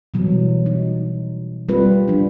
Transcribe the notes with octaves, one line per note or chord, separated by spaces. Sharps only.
B2 E3 F#3 G3
D#4
G3 C4 F4 B4
F3 D4